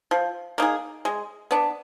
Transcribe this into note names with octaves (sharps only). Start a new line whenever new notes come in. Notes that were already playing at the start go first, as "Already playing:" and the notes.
F3
A#3 D#4 G#4
G#3
B3 D4